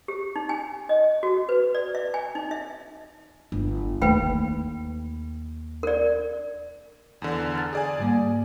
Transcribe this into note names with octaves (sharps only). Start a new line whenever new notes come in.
G4
D#4
G#5
D#5
F#4
B4
D5
E5
G#5
D#4
E5
G1
D#2 A3 B4 G5 B5
A#4 D5
E2 D3
F6 A6
G#4 D5 G#5
G#2 G3 A#3